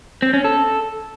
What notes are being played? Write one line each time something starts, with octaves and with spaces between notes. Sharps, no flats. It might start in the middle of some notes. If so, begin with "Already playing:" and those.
C4
C#4
A4